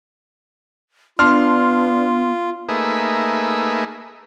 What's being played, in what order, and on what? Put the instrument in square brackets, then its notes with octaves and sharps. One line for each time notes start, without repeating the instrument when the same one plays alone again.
[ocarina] B3 [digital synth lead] D4 [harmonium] F4 [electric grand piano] C6 F6
[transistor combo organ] A3 A#3 D#4 G#4 B4 E5